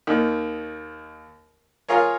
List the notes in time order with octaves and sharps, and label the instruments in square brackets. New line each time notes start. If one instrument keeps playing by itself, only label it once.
[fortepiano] D#2 D#3
F4 G#4 A#4 C#5